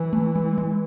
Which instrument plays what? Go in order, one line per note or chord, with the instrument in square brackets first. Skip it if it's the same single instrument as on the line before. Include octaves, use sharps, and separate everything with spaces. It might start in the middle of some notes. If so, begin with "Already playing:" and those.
Already playing: [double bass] E3
[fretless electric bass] A3
G#3
G#3